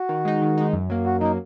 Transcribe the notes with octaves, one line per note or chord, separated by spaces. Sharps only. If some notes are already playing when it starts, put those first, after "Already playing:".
Already playing: F#4
D#3
G#3 D#4
D#3
G#3 D#4
F#2
F#3 A#3
F#2 F#4
F#3 A#3 D#4